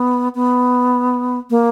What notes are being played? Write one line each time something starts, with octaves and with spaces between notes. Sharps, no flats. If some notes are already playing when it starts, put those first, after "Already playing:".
Already playing: B3
B3
A#3